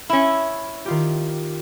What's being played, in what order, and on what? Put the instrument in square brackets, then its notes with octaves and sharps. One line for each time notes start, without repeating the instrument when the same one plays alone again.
[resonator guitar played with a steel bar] C#4 E4
[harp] D#3 F4 G4